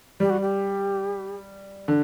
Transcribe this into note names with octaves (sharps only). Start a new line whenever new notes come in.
G3 G4
F#4
G4
D3